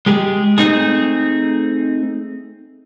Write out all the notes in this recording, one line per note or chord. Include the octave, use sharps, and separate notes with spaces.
G#3 G4 G#4
A3 C4 D#4 G#4